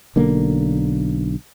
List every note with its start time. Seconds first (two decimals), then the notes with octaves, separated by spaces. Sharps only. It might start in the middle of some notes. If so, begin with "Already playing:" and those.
0.16 B1 D3 A#3